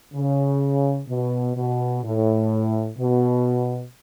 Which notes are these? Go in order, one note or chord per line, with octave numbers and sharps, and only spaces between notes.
C#3
B2
B2
A2
B2